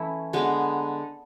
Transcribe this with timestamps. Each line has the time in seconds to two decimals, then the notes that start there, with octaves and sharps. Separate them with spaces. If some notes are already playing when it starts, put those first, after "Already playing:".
Already playing: E3 A3 C#4 E4
0.33 D3 G#3 B3